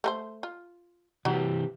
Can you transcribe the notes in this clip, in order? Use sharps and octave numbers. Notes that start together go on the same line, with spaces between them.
A3 A4 C5
F4
C3 E3 F#3 G4